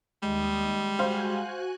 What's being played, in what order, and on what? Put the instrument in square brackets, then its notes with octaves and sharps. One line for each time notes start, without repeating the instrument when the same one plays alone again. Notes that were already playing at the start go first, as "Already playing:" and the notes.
[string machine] D#2 D#6 [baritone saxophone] G3 [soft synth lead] G#3
[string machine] F#4 G#5 F#6 [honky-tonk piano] C5 F5